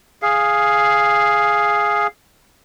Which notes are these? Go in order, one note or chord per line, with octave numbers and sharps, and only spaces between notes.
G#4 F5